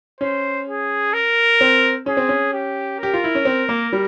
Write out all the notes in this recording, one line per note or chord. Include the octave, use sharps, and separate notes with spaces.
C#4 C5
G#4
A#4
C4
C#4 G#4
C4
C#4
G4
G4 A#4
F4
E4
C#4
C4
A#3
G3